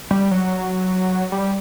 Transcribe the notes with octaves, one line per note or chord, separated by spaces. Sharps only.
G3
F#3
G3